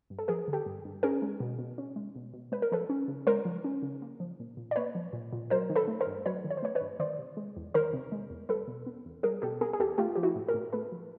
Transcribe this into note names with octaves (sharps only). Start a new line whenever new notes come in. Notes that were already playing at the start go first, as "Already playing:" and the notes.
G2
A4
F3 G#4 A#4
D3
G4 A4
G2
G2
C#4 G#4 A#4
G#3
B2
B2
C#4
G#3
B2
B2
G#3 B4
A#4
F3 A4 B4
C#4
C#3
G#3 A#4 C5
F3
C#4
C#3
A#3
F3
A#2
A#2
D5
A#3 B4 C#5
F3
A#2
A#2
F#3 A#4 C5
D#3
A4 B4
A3
A#4 C5
G2
F#3 B4 C#5
D#3
C#5
C5
A3 B4 C#5
B4 C#5
G2
D#3 C5 D5
C3
G#3
E2
D#3 A#4 C5
C3
G#3
E2
G3 A4 B4
B2
B3
E2
G3 G#4 A#4
B2 G4 A4
B3 G#4 A#4
G#4
E2 G4 A4
A3 F4 G4
F3 G4
E4 F#4
A2
G#4 A#4
A2
A3 A4 B4
F3